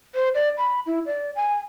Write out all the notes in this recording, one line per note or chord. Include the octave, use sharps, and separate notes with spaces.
C5
D5
B5
E4
D5
G#5